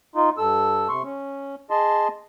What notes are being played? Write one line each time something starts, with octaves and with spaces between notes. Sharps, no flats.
D#4 F4
G2 A4 E6
C3 C6 C#6
C#4
G#4 D#5 A5 C6